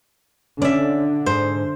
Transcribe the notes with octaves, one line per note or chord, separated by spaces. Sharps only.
D3 C#4 D5 E5
G#2 C5